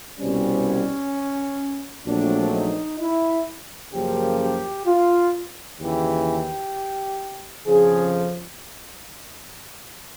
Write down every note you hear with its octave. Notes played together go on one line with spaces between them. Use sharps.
C2 B2 G3 C4 C#4
A#1 A#2 F#3 A3 C4 D4
D#4
E4
F#2 C#3 F3 A#3 G4
G4
F4
D#2 C#3 E3 G4
F2 C#3 F3 G#4